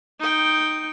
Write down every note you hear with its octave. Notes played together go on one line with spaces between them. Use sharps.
D#4 G5